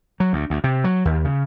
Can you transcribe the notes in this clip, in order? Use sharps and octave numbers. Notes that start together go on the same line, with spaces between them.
F#3
D2
D2
C3
F#3
D#2
C#3